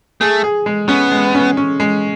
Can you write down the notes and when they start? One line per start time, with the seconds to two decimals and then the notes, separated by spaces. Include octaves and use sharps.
0.21 A3 G#4
0.44 G#4
0.66 G#3
0.89 B3 C#4
1.12 G#3
1.35 C#4
1.57 C#4
1.80 G#3